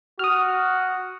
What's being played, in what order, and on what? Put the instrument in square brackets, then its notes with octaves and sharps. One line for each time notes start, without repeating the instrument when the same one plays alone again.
[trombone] F#4 [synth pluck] D#6 F6